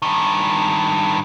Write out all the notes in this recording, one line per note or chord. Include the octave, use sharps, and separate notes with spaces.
G2 D#3